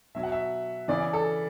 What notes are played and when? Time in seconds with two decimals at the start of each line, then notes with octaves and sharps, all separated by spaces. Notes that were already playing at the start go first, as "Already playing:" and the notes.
0.15 B2 F#3 E5
0.23 F#5
0.32 E5
0.88 C#3 E3 D5
1.13 A4